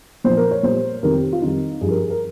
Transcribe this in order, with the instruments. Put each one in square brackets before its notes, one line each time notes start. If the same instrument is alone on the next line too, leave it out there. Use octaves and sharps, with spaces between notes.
[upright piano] A#2 F3 C5
A#4
C#5
A#2 G3 C5
F2 C3 D#3 G3 A#4
G4
F4
F2 D#3 G3 D#4
G2 F3 G#4
A#4
G#4
A#4